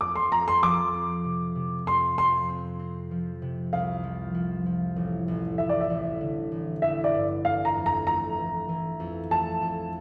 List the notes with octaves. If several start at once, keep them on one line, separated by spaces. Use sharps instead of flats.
F2 D6
C6
F2 A#5
C6
F3 D6
C4
C3
C3
F2 C6
F2 C6
C4
C4
F3
C3
C2 F5
F3
F3
F3
A1
A1
A1 E5
D5
E5
A1
D3
A1
A1 E5
D5
G2
A3 F5
A#5
F2
A#5
A3 A#5
E3
E3
F2
A3 A5
F2